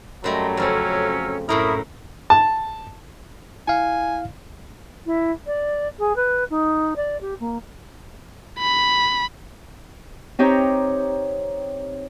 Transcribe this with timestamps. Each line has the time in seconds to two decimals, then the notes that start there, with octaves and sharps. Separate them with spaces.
0.24 F#2 F#3 G3 A3 D#5 C6
0.57 F2 C#3 C4 C#4 E6 F6
1.49 F#2 A2 E4 A#4 C#6 D#6 F6
2.30 A5
3.68 E4 F5 G#5
5.06 E4
5.46 D5
5.99 G#4
6.16 B4
6.50 D#4
6.96 D5
7.21 G4
7.40 A#3
8.58 B5
10.39 C4 D#4 G4 C#5 A#5